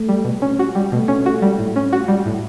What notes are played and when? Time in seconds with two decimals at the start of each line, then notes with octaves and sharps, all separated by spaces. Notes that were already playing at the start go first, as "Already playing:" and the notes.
Already playing: A3
0.09 G3
0.25 B2
0.42 C#4
0.59 F#4
0.75 G3
0.92 B2 A3
1.08 C#4
1.26 F#4
1.42 G3
1.59 A2
1.76 C#4
1.93 F#4
2.08 G3
2.26 A2